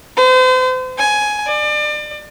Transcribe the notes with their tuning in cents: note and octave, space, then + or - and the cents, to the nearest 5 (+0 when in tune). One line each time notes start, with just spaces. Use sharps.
C5 -40
G#5 +15
D5 +30